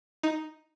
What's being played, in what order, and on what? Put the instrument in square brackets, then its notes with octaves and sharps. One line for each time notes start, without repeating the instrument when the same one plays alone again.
[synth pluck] D#4